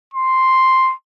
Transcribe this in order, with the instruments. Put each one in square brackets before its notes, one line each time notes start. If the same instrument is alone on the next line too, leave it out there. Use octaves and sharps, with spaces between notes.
[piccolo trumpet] C6